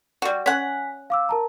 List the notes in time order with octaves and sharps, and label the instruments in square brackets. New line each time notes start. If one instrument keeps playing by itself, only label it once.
[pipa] G3 F#4
[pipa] C#4 F#5 [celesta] G#5 B6
[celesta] F5 D6 E6
A#4 A5 A#5